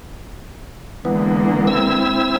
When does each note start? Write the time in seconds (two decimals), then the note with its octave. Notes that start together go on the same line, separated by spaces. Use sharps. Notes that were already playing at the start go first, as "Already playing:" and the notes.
1.05 D3 E3 G#3 A#3 B3
1.67 C4 E4 E6